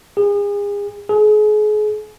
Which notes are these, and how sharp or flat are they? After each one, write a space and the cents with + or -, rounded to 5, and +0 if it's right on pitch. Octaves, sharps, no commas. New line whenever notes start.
G#4 -35
G#4 +35